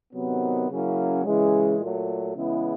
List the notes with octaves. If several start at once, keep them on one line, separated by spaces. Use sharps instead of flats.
C3 D#3 F#3 B3
C#3 F#3 A#3 C#4 E4
C#3 E3 G#3
A#2 F#3 A3
C#3 E3 G#3 B3 E4